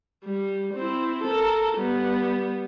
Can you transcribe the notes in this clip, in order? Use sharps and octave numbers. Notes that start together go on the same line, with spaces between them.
G3
C4 E4
A4 A#4
G3 B3